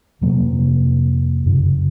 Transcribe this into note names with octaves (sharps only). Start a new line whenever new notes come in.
F2 C3 F#3 A#3
F#2 C#3